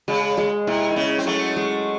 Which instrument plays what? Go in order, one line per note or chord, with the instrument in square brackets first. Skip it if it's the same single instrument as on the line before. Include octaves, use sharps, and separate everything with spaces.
[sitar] C#3 [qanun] G#3
[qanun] G#3
[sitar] C3 [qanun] E4
[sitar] D#3
[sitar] C#3 [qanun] C#4
[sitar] C4
[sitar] F#3 A3 [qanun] G#3
[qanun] G#3